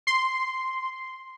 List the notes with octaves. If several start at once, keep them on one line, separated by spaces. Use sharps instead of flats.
C6